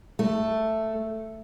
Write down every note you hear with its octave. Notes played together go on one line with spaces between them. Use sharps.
A3